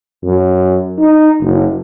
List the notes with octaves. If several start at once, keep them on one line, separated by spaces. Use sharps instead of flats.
F#2
D#4
F#1